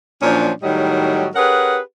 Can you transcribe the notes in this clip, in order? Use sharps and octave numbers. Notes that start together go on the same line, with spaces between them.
A#2 F3 F#3 C#4 D4
A2 D#3 F#3 G3 F#4 D#5
C#4 G4 G#4 A#4 B4 F#5